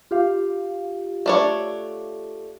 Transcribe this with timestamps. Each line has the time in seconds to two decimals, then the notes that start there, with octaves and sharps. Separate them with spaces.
0.11 F4 G4 F5
1.26 A3 D4 C#5